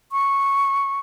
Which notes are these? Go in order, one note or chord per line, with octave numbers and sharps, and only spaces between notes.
C#6